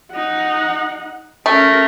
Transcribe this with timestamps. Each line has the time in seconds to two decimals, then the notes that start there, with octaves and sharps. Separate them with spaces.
0.12 D#4 F#5
1.46 A3 C#4 A#4